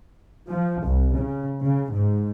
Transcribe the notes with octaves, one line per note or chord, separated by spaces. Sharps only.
F3
C2
C#3
C#3
G#2